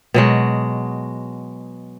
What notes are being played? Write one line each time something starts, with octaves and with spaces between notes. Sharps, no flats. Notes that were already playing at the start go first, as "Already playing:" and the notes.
B2 F#3 G#3